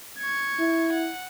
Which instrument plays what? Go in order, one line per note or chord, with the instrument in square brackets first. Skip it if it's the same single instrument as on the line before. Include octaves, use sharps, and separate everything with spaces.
[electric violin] C#6 G#6
[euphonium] E4
[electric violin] F#5